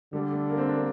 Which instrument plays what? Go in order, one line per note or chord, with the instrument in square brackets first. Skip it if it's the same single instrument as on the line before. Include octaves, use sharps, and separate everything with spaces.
[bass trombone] D3 [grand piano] G3
[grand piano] A3
A#3
C4
D4
A#3